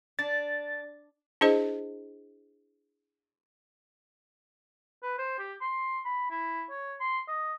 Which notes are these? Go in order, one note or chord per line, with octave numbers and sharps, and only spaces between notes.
D4 A6
D4 E4 G#4 C5 D#5
B4
C5
G4
C6
B5
E4
C#5
C6
D#5